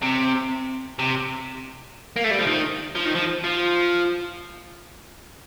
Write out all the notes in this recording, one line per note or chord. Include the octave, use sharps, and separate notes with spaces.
C3
C3
A#3
A3
G3
F3
D#3
F3
D#3
F3
F3